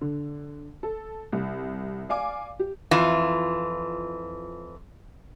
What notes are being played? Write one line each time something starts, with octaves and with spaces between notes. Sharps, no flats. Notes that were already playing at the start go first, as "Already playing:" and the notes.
D3
A4
C2
D5 F5 G#5 D6
G4
F2 E3 F4